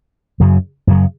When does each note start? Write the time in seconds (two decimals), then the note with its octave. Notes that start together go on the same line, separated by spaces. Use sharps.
0.40 F#2 C#3 F#3
0.87 F#2 C#3 F#3